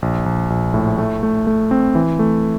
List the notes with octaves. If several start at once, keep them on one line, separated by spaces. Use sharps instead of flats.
A#1
A#1
A#1
A2
A3
A3
A3
C4
E3
A3